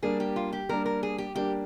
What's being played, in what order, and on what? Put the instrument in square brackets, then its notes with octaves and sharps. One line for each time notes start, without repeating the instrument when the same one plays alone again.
[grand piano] G3 A#3 D4 [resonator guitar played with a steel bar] G#4
[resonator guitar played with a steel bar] G4
F4
G4
[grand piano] G3 A#3 D4 [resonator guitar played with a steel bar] A#4
[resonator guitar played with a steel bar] A#4
G#4
G4
[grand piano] G3 A#3 D4 [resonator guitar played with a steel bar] G4